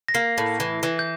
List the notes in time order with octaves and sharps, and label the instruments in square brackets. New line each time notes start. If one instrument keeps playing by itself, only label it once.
[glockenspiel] A#6
[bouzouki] A#3 [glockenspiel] C7
[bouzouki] A2
E3
E3
[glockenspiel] G6